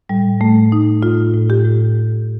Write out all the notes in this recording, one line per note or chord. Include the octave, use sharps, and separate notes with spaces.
A2 G3
A2 A3
A2 D#4
A2 F4
A2
G4
A2